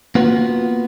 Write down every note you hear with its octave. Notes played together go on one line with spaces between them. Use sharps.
A#3 B3 F4 F#4